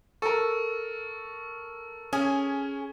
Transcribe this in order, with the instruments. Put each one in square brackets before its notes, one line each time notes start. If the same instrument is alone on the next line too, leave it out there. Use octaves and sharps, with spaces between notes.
[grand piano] A4 A#4 [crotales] C#6
[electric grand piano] C#4 G#5 [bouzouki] G#4